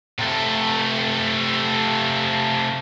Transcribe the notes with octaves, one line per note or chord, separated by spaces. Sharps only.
C3 A3